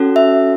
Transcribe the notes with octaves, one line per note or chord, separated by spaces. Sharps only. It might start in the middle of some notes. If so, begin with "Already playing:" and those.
Already playing: C#4 F#4 A4
E5